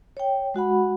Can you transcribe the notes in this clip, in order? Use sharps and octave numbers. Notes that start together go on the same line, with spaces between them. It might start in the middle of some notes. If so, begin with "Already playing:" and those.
C#5 G5
G#3 F#4 F#5 B5